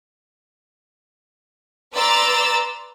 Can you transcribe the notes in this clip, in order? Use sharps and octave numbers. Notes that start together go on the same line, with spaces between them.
B4 D5 A#5 C6 E6 A6